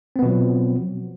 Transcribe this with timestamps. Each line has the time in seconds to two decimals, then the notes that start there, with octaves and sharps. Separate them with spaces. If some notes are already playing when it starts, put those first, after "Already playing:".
0.16 C4
0.19 B3
0.22 B2
0.26 F3
0.29 F#3